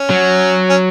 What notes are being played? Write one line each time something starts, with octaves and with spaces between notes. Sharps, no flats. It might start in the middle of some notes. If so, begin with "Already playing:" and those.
Already playing: C#4
F#3
C#4